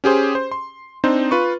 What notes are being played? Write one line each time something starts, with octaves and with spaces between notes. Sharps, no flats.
C#4 G4 G#4 C5
C5
C6
C4 D4 D#4 C5
F4 B4 C#6